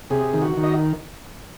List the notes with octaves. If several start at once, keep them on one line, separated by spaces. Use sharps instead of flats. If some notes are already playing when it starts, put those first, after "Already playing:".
C3 G#4
D#3
F#4
D#3
D#5